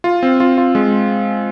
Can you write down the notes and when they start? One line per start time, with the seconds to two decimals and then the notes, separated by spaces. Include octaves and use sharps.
0.04 F4
0.23 C4
0.40 F4
0.58 F4
0.75 G#3